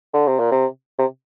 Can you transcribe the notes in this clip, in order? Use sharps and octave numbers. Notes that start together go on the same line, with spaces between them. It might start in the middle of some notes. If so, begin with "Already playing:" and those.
D3
C3
A#2
C3
C3